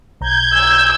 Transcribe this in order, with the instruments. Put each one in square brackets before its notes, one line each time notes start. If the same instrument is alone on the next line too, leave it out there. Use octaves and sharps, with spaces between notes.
[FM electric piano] B1 A#5 [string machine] G6 G#6
[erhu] E6